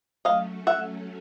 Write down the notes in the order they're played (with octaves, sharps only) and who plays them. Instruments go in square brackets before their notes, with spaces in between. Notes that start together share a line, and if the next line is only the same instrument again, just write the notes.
[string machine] F#3 A3 C#4 [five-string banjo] D#5 F5
[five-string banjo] E5 F#5